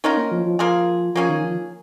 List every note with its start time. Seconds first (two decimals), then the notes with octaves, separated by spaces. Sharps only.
0.04 D#3 C#4 D#4 F4 A#4
0.17 A#3
0.31 F3
0.45 F3
0.59 F3 A#3 F4 G#4
1.15 F3 A#3 C#4 G#4
1.29 D#3
1.44 F3